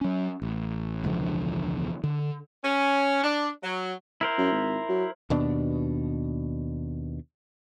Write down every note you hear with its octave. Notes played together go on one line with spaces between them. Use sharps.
F#3 C#4
A1
E1 C#2 D3 F3
D3
C#4
D4
F#3
E4 A#4 C5
F#2
G#1
F#3
D#2 B2 D4